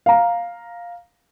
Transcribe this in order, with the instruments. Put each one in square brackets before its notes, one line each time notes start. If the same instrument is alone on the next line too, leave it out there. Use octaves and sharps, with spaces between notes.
[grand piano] F5 A#5